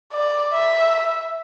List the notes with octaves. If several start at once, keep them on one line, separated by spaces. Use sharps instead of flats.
D5
E5